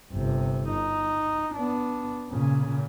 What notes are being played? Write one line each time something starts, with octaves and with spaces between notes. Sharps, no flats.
G1 C3
D#4
B3 D4
A#2 C#3